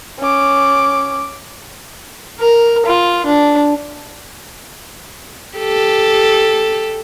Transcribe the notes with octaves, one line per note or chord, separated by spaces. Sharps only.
C#4 D6
A#4
F4
D4
G4 A4